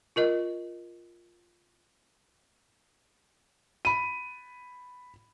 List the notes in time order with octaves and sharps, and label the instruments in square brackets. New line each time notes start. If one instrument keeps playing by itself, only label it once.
[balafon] F4 A#4 D#5
[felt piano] B5 D#7